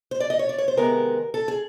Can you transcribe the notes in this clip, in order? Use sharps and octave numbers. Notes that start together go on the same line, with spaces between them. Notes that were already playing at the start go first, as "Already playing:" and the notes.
C5
D5
D#5
C#5
D5
C#5
C5
C3 D#3 G#3 B3 A#4
A4
G#4